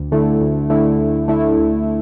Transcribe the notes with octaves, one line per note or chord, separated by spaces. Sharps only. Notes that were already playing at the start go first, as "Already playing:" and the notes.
Already playing: D2
D3 A3 E4
D2
D3 A3 E4
D2
D3 A3 E4
D2